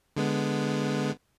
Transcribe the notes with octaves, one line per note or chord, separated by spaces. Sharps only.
D3 G#3 B3